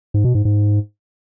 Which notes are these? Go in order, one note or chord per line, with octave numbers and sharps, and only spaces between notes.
G#2
B2
G#2
G#2